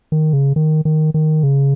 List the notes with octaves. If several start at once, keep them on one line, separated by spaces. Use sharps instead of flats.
D#3
C#3
D#3
D#3
D#3
C#3